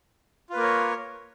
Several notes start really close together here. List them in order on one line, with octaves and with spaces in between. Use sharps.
F4 B4 A#3 A#4 C#5